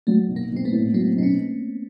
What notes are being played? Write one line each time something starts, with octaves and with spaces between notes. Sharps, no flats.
F#3 A3
B1
A#3
B1
C4
A3 B3
A2
F#3 A#3 C4
B1 C4
B3 C#4